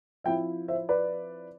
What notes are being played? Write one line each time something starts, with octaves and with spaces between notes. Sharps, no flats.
F3 C4 E4 E5 G5
C5 E5
B4 D5